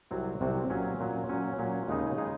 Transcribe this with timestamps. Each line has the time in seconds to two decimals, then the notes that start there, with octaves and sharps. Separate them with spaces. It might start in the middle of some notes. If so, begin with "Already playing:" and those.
0.11 C2 C3 F#3 C4 F#4
0.41 C2 C3 F#3 C4 F#4
0.70 A#2 F#3 C#4
1.00 A#2 F#3 C#4
1.29 A#2 F#3 C#4
1.59 A#2 F#3 C#4
1.88 D#2 C#3 G#3 D#4 G#4
2.18 C#3 G#3 D#4 G#4